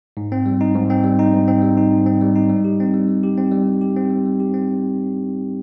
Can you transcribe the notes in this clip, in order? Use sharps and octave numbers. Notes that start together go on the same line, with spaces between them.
G#2
C4
G3
D#4
G#2
C4
G3
D#4
G#2
C4
G3
D#4
G#2
C4
G3
D#4
G3
G4
C4
G3
G3
G4
C4
G3
G3
G4
C4
G3
G3
G4
C4